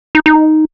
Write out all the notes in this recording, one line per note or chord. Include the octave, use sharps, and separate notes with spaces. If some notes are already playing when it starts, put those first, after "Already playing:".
D#4
D#4